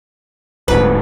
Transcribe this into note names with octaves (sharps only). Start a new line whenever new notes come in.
D1 D2 G#2 B4